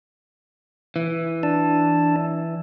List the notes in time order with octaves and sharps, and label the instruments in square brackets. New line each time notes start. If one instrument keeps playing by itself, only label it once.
[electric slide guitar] E3
[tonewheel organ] D4 A5